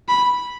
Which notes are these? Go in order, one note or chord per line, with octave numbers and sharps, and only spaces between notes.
B5